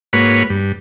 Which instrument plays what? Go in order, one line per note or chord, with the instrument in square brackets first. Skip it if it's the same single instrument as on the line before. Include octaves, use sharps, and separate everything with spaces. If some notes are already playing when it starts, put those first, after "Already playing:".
[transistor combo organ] G#2 A#3 F#4 B4 C#5 B5
G2